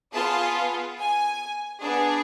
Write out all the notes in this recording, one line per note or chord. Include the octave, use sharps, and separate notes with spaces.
B3 F4 G#4 A5
G#5
B3 D4 G#4